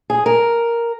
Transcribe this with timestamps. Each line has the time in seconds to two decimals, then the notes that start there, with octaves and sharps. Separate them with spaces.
0.10 G#4
0.26 A#4